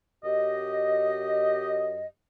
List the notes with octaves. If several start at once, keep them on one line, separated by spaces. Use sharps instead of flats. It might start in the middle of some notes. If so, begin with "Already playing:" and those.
F#2 G4 D#5